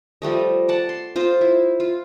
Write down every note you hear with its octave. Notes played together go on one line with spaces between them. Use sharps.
F3 G3 A3 D#5
F#5 A5 D6
C6
F4 C5 D#5
E4
F4